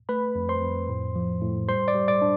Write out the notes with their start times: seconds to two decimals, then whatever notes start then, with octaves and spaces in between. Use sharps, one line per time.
0.09 A3 B4 B5
0.35 F2
0.49 C5 C6
0.62 F2
0.89 A2
1.15 F3
1.41 A2
1.68 G3 C5 C6
1.88 D5 D6
1.95 G3
2.08 D5 D6
2.22 D4